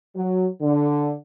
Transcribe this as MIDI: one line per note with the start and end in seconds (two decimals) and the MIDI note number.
0.16 0.46 54
0.61 1.13 50